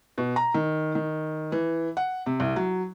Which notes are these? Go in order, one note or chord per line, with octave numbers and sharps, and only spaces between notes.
B2
A#5
D#3
D#3
E3
F#5
C3
C2
F#3